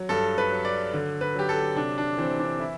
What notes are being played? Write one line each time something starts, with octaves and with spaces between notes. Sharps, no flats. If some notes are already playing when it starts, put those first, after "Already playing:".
Already playing: F#3
G2 A4
B4
F#3
D5
D3
B4
F#3 G4
A4
C3 D4
D4
E3 C4
D4
E4